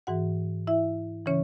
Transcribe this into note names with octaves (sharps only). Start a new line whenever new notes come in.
G#2 E3 F#4 F#5
E4 E5
C#3 E3 C#4 C#5